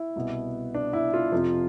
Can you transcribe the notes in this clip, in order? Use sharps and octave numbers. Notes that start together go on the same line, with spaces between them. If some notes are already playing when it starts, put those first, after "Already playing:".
Already playing: E4
C2 B2 B3
D4
E4
F4
F2 C3 F3